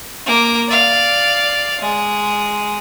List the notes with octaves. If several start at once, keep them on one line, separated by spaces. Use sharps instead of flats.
A#3 D6
D5 F5
G#3